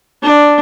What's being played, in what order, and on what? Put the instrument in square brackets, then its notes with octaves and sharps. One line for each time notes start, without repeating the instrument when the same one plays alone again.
[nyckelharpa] D4